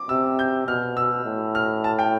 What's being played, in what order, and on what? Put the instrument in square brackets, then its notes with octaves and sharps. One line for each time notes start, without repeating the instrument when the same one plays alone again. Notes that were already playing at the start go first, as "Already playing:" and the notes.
Already playing: [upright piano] D6
[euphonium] C3 [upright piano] E6
[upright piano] G6
[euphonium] B2 [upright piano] F6
[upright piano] E6
[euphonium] A2
[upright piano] F6
A5
G5